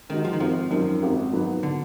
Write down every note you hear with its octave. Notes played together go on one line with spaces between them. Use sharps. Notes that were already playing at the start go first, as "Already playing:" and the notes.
D#3 G#3 D#4 F#4
F3
D#3
G#1 F3
F#2 D#3 F3
G#1
G#2 D#3 F#3 B3
D3